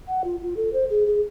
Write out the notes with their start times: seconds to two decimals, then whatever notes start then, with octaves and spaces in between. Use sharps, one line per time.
0.08 F#5
0.24 F4
0.42 F4
0.57 A4
0.73 C5
0.90 G#4
1.07 G#4